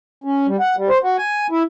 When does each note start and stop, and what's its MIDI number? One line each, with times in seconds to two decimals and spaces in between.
0.24 0.47 61
0.48 0.57 55
0.60 0.76 78
0.77 0.89 55
0.89 0.98 72
1.03 1.17 66
1.18 1.47 80
1.51 1.63 64